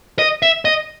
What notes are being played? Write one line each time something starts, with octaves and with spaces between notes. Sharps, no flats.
D#5
E5
D#5